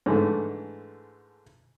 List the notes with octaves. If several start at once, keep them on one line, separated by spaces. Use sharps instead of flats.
G#2 D3 E3 A3